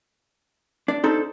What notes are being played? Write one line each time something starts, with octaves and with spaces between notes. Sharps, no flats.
D4 D5
D4 D#4 A4 C5